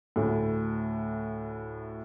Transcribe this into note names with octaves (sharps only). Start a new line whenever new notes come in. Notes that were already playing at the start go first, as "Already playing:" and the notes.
D2 A2